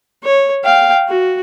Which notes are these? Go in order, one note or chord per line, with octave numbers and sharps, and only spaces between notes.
C#5
F5 G5
F#4